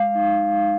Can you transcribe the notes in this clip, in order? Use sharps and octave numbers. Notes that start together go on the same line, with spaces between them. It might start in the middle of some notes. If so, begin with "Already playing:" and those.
Already playing: G#3 F5
D#4